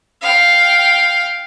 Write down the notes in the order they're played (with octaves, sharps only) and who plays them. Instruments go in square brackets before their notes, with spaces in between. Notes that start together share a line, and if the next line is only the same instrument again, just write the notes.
[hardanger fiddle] F5 G5